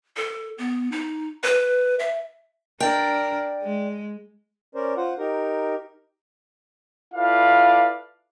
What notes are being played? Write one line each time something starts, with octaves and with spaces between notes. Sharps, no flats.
A4
B3
D#4
B4
E5
D4 A#4 D5 G5
G#3
C#4 A#4 C5 D5
F4 C5 F#5
D#4 G4 A#4
E4 F4 A4 B4 D5 F5